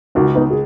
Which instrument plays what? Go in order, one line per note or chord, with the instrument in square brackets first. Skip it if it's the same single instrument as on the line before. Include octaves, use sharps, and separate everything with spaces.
[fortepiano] C#2 [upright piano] D#4 F#4
[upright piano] B3 D#4
G#4